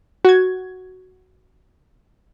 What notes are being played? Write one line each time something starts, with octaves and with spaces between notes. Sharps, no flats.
F#4 G#6